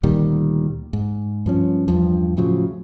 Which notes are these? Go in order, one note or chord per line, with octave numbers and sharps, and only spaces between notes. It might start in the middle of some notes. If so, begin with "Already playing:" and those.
D2 A#2 D#3 G3
G#2
G2 F3 C#4
E2 G2 F3
A2 C#3 F3 F#3